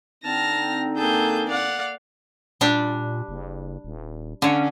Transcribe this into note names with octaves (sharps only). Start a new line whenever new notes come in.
D3 C4 D#4 A5 F6 A#6
A#3 G#4 A4 G6
D5 F5 F#5
A#2 G3 D4 G4
F#1
D#1
D3 C#4 C#5